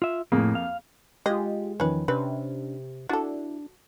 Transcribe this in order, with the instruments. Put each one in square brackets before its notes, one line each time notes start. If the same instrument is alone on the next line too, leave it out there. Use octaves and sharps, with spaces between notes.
[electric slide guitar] F4 E5
[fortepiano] F2 A#3 G#4 [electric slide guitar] A2
[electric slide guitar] F5
[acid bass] G#3 [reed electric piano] F4 G4 [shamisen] D#5
[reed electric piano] E2 D#3 F3 [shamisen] C#4 B4
[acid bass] C3 [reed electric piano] C#4 D4 [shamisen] B4
[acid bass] D4 [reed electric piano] E4 [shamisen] F#4 A4